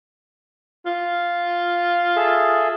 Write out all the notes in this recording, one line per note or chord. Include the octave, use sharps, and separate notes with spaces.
F4
G#4 A4 E5